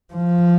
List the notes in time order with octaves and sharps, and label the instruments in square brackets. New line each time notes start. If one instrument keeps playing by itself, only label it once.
[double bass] F3